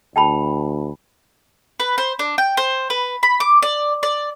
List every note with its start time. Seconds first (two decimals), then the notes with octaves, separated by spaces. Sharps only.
0.16 D2 G5 A5 B5
1.80 B4
1.98 C5
2.19 D4
2.38 G5
2.57 C5
2.90 B4
3.23 B5
3.40 D6
3.62 D5
4.03 D5